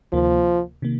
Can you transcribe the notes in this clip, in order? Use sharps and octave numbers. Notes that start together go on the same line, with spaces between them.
D2 C3 D#3 F3 A#3
C3 D#3 A#3